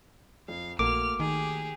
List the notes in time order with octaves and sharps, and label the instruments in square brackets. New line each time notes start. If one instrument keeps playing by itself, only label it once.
[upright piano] F2 [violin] F5
[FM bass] A#1 [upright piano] A3 A#3 F#4 [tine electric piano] D6 [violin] F6 F7
[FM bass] D#3 [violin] G4 G#4